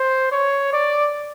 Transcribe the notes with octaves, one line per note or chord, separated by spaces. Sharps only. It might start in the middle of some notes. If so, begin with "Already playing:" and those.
Already playing: C5
C#5
D5